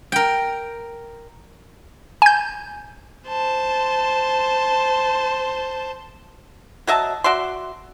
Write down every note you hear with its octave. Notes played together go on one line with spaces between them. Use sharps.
A#4 G5
G#5 G6
C5 A5
F#3 D#5 E5 A5
F#4 D5 E5 C6